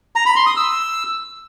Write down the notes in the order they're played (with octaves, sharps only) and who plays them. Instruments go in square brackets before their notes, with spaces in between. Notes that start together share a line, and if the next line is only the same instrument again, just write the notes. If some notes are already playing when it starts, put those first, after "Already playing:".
[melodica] A#5
B5
C6
D#6
E6